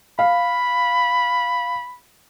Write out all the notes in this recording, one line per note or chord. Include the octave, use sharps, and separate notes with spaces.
F5 B5